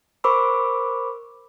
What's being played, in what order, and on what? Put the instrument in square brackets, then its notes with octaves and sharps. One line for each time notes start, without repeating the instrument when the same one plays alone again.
[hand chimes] A#4 C5 B5 C#6 D6 E6